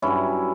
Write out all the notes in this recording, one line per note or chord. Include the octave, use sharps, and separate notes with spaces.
G2 F#3 C#4 E4